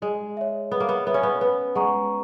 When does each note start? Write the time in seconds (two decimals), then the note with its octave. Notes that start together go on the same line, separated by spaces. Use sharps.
0.02 G#3 G#4
0.37 C#5 E5
0.71 B3 G#4
0.80 A#3
0.89 B3
1.07 B3 C#5 E5
1.14 C#4
1.23 B3
1.41 B3 B4
1.75 G#3 F#5 A#5 C#6